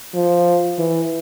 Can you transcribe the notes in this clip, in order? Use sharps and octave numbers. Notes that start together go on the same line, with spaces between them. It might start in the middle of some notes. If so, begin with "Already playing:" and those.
F3
E3